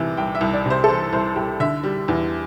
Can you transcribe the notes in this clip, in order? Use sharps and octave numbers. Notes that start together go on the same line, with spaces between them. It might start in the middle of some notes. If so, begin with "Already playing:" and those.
Already playing: C2 C3 E3
C2 G5
E5
C2
D5
C3
C5
A4
E3 C5
C2 C5
C2 G4
D3 E5
G3
E2